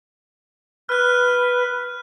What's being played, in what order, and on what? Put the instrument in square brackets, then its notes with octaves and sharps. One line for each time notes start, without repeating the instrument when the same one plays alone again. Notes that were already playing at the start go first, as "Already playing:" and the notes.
[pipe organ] B4 [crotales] F6 F#6